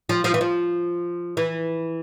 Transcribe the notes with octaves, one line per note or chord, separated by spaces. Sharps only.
F3
F3
E3
F3
E3